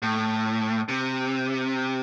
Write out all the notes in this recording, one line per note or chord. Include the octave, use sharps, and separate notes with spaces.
A2
C3